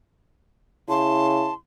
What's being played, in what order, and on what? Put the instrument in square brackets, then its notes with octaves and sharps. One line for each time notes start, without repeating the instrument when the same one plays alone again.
[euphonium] C#3 [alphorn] E4 [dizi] A5 [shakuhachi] C6